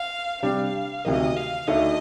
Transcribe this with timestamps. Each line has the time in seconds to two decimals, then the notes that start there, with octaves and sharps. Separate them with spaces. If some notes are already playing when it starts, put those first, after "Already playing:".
Already playing: F5
0.42 C3 G3 D4 F5
1.05 D2 C3 D#3 A#3 D#5
1.37 F5
1.67 D2 D3 A3 D#4 D#5